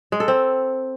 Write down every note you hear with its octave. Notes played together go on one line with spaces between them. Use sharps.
G#3
A4
C4